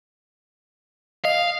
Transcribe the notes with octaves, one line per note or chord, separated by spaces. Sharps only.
D#5 F5